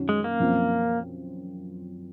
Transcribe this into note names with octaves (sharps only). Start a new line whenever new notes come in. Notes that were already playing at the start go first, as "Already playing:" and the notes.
Already playing: F#2 D#3 F#3 C#4
G#3
A#3
F#2 F3 C4